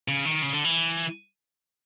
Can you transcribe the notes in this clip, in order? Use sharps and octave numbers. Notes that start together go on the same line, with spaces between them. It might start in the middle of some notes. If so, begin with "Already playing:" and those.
C#3
D#3
C#3
D3
E3